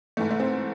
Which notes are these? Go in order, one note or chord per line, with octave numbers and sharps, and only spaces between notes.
G#2 E3 A3
A3
C4